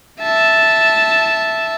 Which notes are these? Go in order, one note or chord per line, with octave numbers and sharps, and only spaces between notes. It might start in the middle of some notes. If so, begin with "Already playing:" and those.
E5 A5